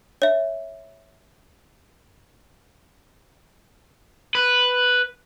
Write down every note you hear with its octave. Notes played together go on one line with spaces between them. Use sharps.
C#5 E5
B4